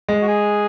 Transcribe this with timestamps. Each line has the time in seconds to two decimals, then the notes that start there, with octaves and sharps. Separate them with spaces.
0.08 G#3
0.22 F#4
0.28 G#4